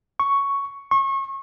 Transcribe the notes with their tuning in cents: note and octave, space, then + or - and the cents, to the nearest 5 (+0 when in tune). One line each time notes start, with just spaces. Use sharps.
C#6 +5
C#6 -30